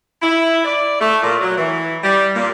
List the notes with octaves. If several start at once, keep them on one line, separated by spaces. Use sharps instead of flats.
E4
D5
A3
A#2
F#3
E3
G3
A#2